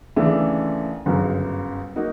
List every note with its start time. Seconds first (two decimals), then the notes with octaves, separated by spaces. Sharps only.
0.16 D#2 C#3 E3 A3 D4
1.06 G1 F#2 C#3
1.96 A#3 D#4 F#4